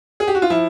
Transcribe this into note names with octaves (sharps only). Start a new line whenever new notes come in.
G#4
G4
F#4
F4
F3 E4